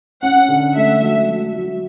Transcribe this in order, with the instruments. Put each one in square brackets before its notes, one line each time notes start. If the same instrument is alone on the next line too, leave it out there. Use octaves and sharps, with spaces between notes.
[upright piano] C#4 [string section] F#5
[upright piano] D3
[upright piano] A3 [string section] E5
[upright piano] F#3
F#3
F#3